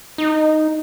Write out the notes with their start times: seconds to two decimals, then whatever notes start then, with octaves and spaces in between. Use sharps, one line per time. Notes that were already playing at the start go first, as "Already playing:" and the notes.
0.18 D#4